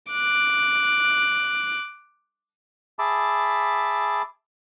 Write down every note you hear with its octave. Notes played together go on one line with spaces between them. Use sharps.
D6 F#6
G#4 E5 A5 B5 D6